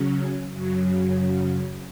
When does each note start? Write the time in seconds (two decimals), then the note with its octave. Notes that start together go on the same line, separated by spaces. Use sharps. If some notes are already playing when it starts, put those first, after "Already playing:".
Already playing: C#3 F#3 C#4
0.52 F#2 C#3 F#3